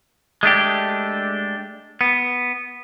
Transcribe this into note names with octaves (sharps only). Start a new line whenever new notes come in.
G#3 A3 D4 G4
B3